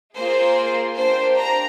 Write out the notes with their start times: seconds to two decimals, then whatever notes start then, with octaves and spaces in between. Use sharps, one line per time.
0.17 A#3 F4 G#4 C5
0.97 A#3 D4 G4 C5
1.38 A#5